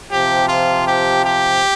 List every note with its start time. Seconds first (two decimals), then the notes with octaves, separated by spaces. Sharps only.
0.11 C3 F3 G4
0.49 F4
0.87 G4
1.25 G4